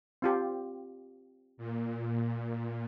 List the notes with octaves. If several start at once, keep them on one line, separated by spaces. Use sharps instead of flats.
C4 F4 G4
A#2